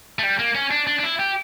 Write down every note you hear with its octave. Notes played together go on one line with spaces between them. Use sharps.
A3
G3
A#3
C#4
D4
D4
D4
E4
G4